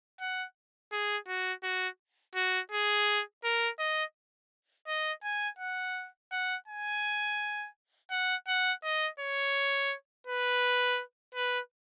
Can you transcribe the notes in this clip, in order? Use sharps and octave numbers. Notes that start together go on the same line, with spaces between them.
F#5
G#4
F#4
F#4
F#4
G#4
A#4
D#5
D#5
G#5
F#5
F#5
G#5
F#5
F#5
D#5
C#5
B4
B4